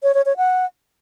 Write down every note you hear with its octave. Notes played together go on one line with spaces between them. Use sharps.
C#5
C#5
C#5
F#5